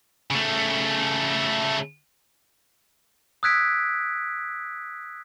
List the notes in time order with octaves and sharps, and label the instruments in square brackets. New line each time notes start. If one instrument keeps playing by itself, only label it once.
[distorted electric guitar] C#3 A3
[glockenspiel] D#6 E6 F#6 G#6 B6 D7